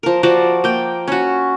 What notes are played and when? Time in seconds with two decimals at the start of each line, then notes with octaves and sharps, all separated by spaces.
0.03 F3 A#4
0.23 F3 F#4 D5
0.64 A#3 G5
1.08 C#4 F#4